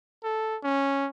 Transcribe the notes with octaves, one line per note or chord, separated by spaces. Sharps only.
A4
C#4